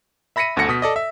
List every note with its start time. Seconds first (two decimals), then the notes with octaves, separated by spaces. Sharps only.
0.36 E5 B5 A#6 B6 C#7 D#7
0.56 G1 D2 A4 F#5 A#6 C#7
0.69 B2 D#6 B6
0.82 A4 D5 D#5
0.96 E5